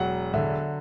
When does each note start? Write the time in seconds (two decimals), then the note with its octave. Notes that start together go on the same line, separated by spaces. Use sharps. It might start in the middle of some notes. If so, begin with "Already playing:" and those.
Already playing: E1 F#3 F#5
0.34 D3 E5